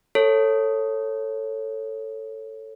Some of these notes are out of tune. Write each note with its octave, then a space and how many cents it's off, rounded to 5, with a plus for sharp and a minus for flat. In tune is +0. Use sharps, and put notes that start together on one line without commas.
A4 +15 C#5 -10